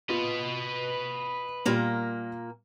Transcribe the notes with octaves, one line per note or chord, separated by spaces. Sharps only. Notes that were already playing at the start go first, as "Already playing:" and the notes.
F4 B4 D#5
A#2 G3 A#3 F4 A#5